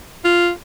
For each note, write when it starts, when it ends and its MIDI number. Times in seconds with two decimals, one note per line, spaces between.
0.24 0.50 65